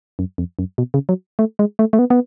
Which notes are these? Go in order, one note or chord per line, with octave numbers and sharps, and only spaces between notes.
F#2
F2
F#2
B2
C#3
F#3
A3
G#3
A3
A3
B3
B3